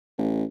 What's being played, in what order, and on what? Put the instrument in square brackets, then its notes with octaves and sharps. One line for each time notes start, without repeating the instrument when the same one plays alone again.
[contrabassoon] A1